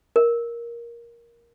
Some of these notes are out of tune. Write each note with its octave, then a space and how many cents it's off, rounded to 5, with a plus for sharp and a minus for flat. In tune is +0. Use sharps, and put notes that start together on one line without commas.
A#4 +10